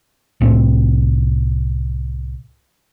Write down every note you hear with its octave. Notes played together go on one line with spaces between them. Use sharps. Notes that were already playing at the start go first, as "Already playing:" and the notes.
C2 A2 C4